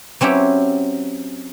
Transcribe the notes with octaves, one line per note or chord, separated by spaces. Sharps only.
F#3 C4 C#4 E4 G4